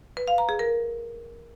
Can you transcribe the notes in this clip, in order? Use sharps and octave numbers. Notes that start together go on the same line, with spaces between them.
B4
F5
A#5
G#4
A#4